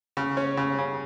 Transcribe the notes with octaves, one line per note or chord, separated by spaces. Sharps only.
C#3
C#4
C#3
C#3